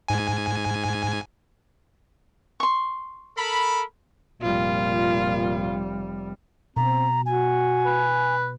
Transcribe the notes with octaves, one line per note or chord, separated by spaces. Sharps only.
G#2 G#5
C6 C#6
A4 A#4 B5
F1 A#2 G3 F4
B2 C4 A#5
F#4 G#5
B4